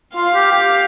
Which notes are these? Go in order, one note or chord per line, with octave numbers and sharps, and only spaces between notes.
F4 F5
G4
G4